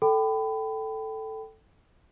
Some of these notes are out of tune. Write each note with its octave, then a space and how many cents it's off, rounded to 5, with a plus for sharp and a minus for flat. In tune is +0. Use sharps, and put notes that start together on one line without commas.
A4 +0 G5 -15 B5 +25